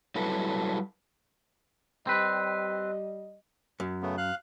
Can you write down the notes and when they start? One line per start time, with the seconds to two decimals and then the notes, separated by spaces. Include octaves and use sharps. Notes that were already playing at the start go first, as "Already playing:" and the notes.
0.15 F#3 G3 E4 A4 B4
2.07 G3 C4 B4 D#5
3.80 F#2
4.02 C#3 A3 B3
4.18 F5 F#6